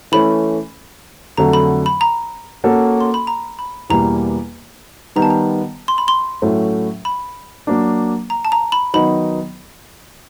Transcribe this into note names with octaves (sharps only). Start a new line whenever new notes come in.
E3 A3 C#4 B5
F2 D3 F#3 A3 A#5
B5
B5
A#5
A#3 C#4 F#4 A4
C6
B5
A#5
B5
E2 B2 G3 A#3 A#5
D#3 G3 B3 A#5
A5
A#5
C6
B5
C6
A2 F#3 A3 C#4
B5
F#3 A#3 D4
A#5
A5
A#5
B5
D#3 F#3 B3 D#4 B5